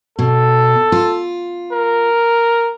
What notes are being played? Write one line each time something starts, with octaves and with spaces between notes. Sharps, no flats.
B2 A4
F4
A#4